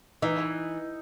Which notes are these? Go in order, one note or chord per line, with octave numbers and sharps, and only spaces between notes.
E3 D#4